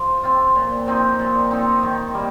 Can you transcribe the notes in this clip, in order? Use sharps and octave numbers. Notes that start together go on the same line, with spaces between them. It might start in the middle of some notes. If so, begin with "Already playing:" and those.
Already playing: F3
C4 F4
A#2
F3 C4 D#4
A#2
F3 C4 D#4
D#3
G3 A#3